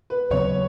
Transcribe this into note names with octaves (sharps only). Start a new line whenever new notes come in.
B4
D#2 C#3 F#3 B3 C#5